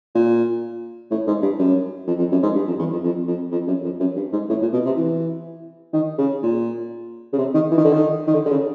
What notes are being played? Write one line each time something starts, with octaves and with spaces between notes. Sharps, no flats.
A#2
A2
G#2
G2
F#2
F2
F2
F#2
G#2
G2
F2
E2
F2
F2
F2
F2
F#2
F2
F#2
G2
G#2
A2
A#2
B2
C3
E3
D#3
C#3
A#2
C#3
C3
D#3
E3
D#3
D3
D#3
D#3
D3
D3
C#3